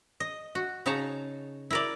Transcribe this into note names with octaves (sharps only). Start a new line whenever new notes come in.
D#5
F#4
C#3 D#4 G#4 C#5 A5 A#5
E4 A#4 D5